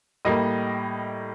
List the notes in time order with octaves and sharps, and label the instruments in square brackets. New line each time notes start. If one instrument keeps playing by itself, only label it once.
[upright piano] A2 G3 A#3 D#5